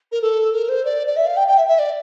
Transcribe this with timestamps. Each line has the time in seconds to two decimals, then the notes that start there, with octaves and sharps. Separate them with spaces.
0.12 A#4
0.22 A4
0.53 A#4
0.69 C5
0.85 D5
1.07 D5
1.16 E5
1.26 F5
1.37 G5
1.47 G5
1.58 E5
1.68 E5
1.79 D5